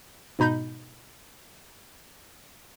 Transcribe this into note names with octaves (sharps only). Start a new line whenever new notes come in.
G#2 B2 D#4 B5 G6